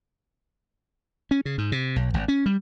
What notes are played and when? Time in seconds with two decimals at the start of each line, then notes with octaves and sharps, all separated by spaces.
1.31 C#4
1.45 C#3
1.58 G#2
1.72 C3
1.96 B1
2.14 G#1
2.28 C#4
2.46 G3